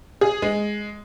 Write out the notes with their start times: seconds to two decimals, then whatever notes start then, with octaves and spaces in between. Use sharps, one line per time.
0.21 G#4
0.42 G#3